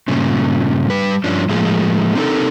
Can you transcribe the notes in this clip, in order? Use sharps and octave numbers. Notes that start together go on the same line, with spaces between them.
G2 A#2 C#3
G3 B4
G2 F3 C#4 D4
A2 F3 G#3 A#3
C4 D4 D#4 A4 A#4